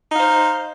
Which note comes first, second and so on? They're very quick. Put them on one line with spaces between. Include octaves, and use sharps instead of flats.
D#4 F5 C5